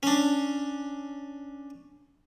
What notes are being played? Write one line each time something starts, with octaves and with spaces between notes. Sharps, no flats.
C#4 D4